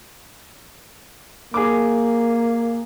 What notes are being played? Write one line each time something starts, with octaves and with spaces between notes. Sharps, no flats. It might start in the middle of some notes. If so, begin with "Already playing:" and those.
A#3 G#4 D6